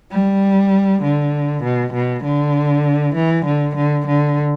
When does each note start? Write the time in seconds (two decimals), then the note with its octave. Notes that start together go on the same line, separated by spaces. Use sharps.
0.12 G3
1.03 D3
1.63 B2
1.94 B2
2.24 D3
3.15 E3
3.46 D3
3.76 D3
4.07 D3